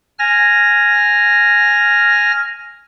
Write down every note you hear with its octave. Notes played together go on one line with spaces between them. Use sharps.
G#5 F6 A#6